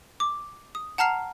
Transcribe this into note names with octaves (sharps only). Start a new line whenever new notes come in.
D6
D#6
F#5 A5 A#5 F6 C7 F7